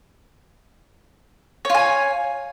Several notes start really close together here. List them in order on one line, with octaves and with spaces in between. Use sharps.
C#5 F4 G#5